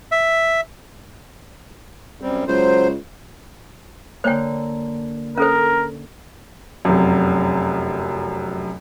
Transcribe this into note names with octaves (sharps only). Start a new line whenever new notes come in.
E5
F#2 G3 C4
C#2 F#3 C5
D3 A#3 C5 C#5 G5
C#4 A4 A#4 C5
F1 F#2